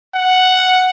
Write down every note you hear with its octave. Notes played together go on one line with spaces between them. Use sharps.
F#5